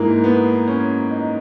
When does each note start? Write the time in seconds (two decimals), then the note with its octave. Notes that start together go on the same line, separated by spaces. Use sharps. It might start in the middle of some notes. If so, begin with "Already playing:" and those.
Already playing: G#2 E3 A#3
0.24 B3
0.67 C#4
1.11 D#4